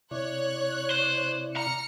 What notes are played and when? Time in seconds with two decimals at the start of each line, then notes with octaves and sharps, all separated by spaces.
0.11 C3 E4 C#5 D5 F#6
0.90 C5
1.56 A#5 F6 C#7